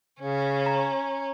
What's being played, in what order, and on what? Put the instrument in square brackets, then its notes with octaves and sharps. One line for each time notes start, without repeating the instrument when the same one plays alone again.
[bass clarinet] C#3 [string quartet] C#4
[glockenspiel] A#5